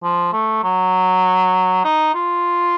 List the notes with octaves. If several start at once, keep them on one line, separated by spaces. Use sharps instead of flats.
F3
A3
F#3
D#4
F4